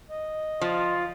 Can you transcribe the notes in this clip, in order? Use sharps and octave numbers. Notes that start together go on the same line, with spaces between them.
D#5
F3 F4